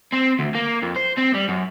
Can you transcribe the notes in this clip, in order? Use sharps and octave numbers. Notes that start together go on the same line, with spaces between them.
C4
D2
A#3
F2
C5
C4
G3
F#2